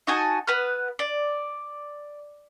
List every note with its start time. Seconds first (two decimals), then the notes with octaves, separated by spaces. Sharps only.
0.07 D#4 F#4 G#5 A5
0.47 B3 B4 F#5 F6
0.99 D5